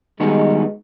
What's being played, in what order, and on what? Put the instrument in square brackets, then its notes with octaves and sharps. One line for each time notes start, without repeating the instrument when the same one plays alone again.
[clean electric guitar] D#3 G3 B3 D#4 F#4 [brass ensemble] G#3